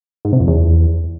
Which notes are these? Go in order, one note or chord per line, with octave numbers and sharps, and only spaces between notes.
G#2
C3
F2
E2